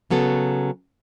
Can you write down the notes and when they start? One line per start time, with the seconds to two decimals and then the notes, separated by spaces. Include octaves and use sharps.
0.10 C#3 F#3 B3 A4